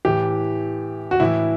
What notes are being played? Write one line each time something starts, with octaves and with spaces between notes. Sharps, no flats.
A2 E3 G4
F#4
A2 E3 E4